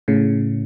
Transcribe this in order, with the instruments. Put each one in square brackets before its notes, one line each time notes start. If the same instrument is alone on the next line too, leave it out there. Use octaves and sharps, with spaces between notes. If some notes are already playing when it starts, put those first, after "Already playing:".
[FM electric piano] A2 C#3